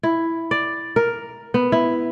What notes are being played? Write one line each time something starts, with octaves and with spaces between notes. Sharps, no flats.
E4
D5
A#4
B3
E4